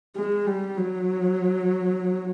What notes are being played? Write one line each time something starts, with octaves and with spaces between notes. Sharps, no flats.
G#3
G3
F#3